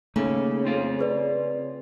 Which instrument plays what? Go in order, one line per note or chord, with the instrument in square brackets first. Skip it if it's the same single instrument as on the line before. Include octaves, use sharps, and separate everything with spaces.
[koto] C#3 [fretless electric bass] A3 [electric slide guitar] A#3 D#4
[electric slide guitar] C4 F4 F5
[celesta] G#4 B4 D5